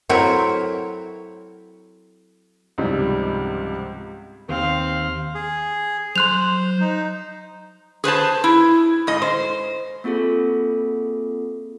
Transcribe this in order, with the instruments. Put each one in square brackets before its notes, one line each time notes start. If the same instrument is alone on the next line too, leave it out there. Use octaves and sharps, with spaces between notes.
[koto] F#3 A3 C4 E4 A#4 C#5
[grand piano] C#2 G#2 C3 F3 G3
[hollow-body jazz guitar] D#2 [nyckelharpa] C4 F5
[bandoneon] G#4
[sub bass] F#3 [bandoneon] C5 [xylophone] C6 F#6 F7
[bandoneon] D#4
[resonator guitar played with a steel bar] G#4 B4 C5 A5
E4
G#2 D#5
C5
[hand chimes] A#3 C4 F4 G#4 A4